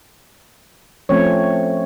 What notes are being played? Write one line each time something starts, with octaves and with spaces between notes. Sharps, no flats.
F3 A3 C4 C#4 C#5